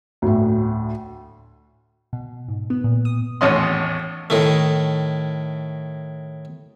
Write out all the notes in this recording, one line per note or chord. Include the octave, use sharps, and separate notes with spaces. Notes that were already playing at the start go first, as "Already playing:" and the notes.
D2 A2
B2
G#2
B3
A#2
D#6
G#1 E2 A2 C#4 D#5 C6
A2 D#3 A3